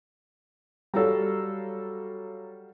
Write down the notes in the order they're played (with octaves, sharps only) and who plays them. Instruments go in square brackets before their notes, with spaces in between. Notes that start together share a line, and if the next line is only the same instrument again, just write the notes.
[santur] F#3 F5 A#5 [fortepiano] G3 A4